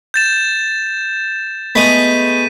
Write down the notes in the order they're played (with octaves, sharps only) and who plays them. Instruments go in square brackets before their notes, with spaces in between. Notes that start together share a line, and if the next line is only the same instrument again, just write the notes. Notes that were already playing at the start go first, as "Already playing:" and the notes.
[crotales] G6 A6 E7
[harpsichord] G#3 A3 B3 [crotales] B6 D#7